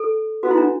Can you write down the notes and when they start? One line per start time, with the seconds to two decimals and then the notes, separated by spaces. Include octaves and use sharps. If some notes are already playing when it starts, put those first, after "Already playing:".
Already playing: A4
0.43 B3 F#4
0.51 E4
0.58 D4